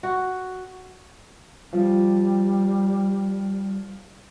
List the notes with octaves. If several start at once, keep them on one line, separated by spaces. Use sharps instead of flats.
F#4
F3 G3